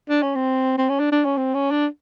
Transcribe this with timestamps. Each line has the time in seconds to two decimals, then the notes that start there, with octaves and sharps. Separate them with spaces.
0.09 D4
0.22 C#4
0.35 C4
0.78 C4
0.89 C#4
1.00 D4
1.12 D4
1.25 C#4
1.37 C4
1.54 C#4
1.71 D4